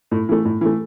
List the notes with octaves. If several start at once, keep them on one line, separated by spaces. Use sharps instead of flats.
A2
E3 A3
A2
E3 A3